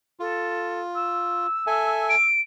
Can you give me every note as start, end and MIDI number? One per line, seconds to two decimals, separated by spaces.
0.20 1.47 65
0.20 0.81 69
0.95 2.25 88
1.67 2.15 69
1.67 2.15 76
1.67 2.15 80
2.09 2.40 98